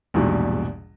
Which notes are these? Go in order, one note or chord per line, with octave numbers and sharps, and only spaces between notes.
A#1 E2 G#2 B2 G3